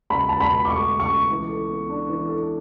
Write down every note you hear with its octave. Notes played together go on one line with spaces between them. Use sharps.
C#2 B5
C#2 A5
B5
B2
D6
A3 C#6
C#2
C#6
C#2
E3
A4
B3
D4
E3
A4